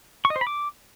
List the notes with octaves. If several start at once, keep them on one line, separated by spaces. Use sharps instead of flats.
C#6
D#5
C5
B5
D6